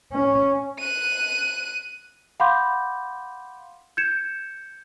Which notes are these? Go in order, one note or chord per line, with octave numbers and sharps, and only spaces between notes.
C#4
F#6 D#7
F5 F#5 B5 C6 D6 G6
G6 G#6 C#7 E7